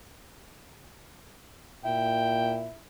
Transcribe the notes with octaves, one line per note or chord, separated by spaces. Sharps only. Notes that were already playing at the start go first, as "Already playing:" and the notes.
A#2 E4 G5